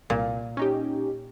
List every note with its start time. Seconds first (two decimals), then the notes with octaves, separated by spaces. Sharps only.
0.10 C2 A#2
0.57 C#4 D#4 G4